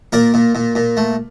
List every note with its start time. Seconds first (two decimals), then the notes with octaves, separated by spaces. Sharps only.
0.13 A#2 A#4 D5
0.34 A#2
0.55 A#2
0.75 A#2
0.97 A3